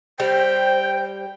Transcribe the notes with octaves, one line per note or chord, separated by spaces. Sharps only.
G3 C5 G5